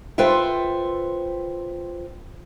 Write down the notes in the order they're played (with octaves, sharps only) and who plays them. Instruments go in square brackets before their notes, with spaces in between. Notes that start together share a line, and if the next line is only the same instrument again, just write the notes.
[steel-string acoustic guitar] F4 A4 B4 C5 E5 G5